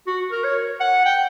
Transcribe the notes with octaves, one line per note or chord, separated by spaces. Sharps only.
F#4
A#4
C#5
F#5
G5